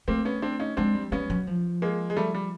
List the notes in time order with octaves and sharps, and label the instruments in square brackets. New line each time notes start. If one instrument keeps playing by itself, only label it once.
[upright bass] A3 [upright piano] A#3 C4
[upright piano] B3 C#4
C4 D4
C#4 D#4
[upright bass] G#3 [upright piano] C4 D4
[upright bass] G3
[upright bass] G3 [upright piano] B3 C#4
[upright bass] F#3
F3
[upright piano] G#3 A#3
G#3
G3 A3
G3